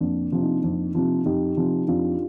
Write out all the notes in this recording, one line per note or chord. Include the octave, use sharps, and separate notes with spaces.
F2 A#3 D4
C3 F3
C4 D#4
F2
C3 F3
F2 D#4 G4
C3 F3
F2 D4 F4